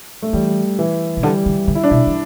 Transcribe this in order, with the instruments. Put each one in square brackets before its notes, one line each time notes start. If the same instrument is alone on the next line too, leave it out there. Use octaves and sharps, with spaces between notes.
[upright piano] A3
[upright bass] E3 [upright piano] G3
[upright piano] E3
[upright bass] B2
[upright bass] D3 [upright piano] G3
[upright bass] D3
D3
[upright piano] E4
D4
[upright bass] B2 [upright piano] E4
[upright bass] E3